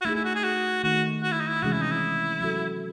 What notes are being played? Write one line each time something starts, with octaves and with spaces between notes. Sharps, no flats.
F#4
A3 D#4 E4 G#4
E4
F#4
G#4
F#4
D#3 A3 D#4 F#4
F#4
E4
D#4
E4
C3 E3 G#3 C#4 F#4 G#4
E4
D#4
E4
F#3 C#4 F#4 A4